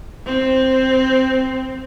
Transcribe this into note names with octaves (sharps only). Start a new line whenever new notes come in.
C4